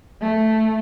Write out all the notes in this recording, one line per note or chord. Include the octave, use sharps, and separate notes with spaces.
A3